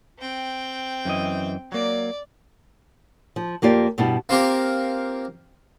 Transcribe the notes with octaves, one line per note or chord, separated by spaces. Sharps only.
C4 G5
F#2 E3 D#5
F#3 A#3 D5
F3
F2 A#3 F4 G4 D5
G2 B2 G3 D4 E4
A#3 C4 F4 G4 A#4